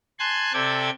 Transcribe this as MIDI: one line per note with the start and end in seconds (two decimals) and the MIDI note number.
0.19 0.53 80
0.19 0.53 81
0.19 0.53 84
0.19 0.53 90
0.19 0.53 92
0.53 0.90 48
0.53 0.90 69
0.53 0.90 74
0.53 0.90 79
0.53 0.90 92